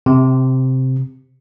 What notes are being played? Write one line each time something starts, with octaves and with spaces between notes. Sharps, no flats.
C3